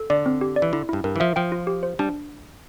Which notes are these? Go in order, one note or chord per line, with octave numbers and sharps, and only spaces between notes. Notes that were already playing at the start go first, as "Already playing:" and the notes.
Already playing: A4
D3 D5
C4
G4
D5
E3
D3 E4
G2 E4
G2 A#4
E3
F3 E5
F3 G5
F4
G4
C5
G3 D4